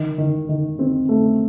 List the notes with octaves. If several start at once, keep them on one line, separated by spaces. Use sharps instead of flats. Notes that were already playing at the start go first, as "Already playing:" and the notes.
Already playing: D#3
D#3
D#3
C4
A3